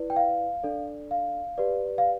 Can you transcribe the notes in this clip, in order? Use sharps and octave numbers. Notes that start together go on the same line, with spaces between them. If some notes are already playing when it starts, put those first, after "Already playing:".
Already playing: E4 B4 D5
G5
F5
D4 A4 D5
F5
G4 B4 D5
F5